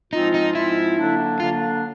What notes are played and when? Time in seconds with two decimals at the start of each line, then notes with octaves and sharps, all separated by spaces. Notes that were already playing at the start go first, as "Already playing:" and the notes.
0.12 G#2 F3 G#3 C4 D#4 F4
0.34 D#4
0.55 G#2 F3 G#3 C4 E4 F4
0.98 D3 F#3 A#3 D4
1.40 D3 F#3 A#3 D4 F4